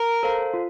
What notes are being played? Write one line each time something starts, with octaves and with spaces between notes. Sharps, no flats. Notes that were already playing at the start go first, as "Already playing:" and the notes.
Already playing: A#4
A4 C5 F5
F4